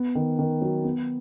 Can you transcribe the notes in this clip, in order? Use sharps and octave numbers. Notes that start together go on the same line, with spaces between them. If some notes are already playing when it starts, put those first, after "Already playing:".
Already playing: B3
D#3
D#3
F#3
B3